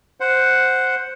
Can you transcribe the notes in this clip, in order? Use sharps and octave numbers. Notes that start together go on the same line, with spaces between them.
C5 F#5